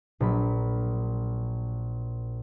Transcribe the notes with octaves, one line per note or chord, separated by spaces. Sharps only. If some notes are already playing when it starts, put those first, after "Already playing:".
A#1 F#3 B5